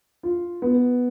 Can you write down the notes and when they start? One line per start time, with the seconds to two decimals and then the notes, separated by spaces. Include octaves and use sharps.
0.23 F4
0.62 B3